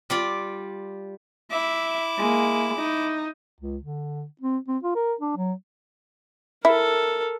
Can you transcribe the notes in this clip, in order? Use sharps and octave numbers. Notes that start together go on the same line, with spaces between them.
G3 F4 D5
E4 E5 D6
G#3 A#3
D#4
C#2
D3
C4
C4
F4
A#4
D4
F#3
E4 A4 A#4